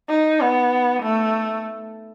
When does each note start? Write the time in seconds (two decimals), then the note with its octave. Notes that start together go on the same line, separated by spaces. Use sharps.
0.10 D#4
0.41 B3
1.02 A3